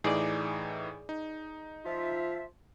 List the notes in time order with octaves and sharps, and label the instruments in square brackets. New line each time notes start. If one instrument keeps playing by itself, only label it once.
[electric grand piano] A2 E3 D#4 [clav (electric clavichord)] G#4 D5
[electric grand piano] D#4
[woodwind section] F3 F4 E5